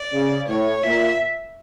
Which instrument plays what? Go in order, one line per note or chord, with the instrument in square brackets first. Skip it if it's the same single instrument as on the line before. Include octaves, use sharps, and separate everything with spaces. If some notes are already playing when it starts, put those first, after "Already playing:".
Already playing: [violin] D5
[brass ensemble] C#3
[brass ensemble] A2 [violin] C#5
[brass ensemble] A#2 [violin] E5